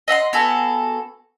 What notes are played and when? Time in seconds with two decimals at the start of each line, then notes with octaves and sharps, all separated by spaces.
0.08 D#5 E5 F#5 C6
0.33 B3 F#4 G#4 A4